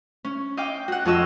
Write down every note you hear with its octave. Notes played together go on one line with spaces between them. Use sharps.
C#4
D#5 F5 G5 D6
F#4 F#5
F2 F4 C#5 D#5 E6